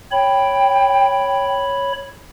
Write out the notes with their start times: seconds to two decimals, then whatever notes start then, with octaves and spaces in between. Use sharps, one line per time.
0.11 C#5 G5 B5